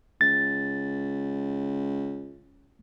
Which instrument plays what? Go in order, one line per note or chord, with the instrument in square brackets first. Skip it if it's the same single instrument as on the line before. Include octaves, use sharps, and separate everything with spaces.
[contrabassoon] C#2 [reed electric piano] A6